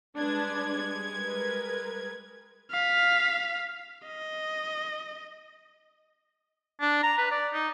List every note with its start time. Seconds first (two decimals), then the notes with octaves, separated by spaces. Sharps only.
0.17 G3 G#3 D4 B4 G#6
1.18 A#4 B4
2.71 F5 B6
4.06 D#5
6.81 D4
7.03 A#5
7.18 B4
7.31 D5
7.53 D#4